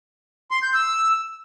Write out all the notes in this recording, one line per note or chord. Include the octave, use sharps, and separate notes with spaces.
C6
G6
E6